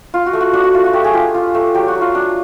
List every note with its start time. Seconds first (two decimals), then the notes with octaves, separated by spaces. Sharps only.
0.14 F4
0.26 F#4
0.33 A3
0.41 F#4
0.53 D4 F#4
0.64 F#4
0.74 A3 F4
0.84 F#4
0.93 A3 G4
1.04 G#4
1.14 F4 G4
1.34 F4
1.55 A3
1.75 F#3 G4
1.88 F#4
1.95 F#3
2.01 F4
2.15 D4